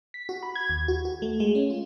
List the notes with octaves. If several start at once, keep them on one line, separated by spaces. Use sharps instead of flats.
B6
F#4
B5
G#6
D#2
F#4
F#4
A3
G#3
C#4
F4